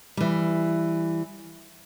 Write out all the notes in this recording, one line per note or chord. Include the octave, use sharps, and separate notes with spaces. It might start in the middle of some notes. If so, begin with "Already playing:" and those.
E3 G3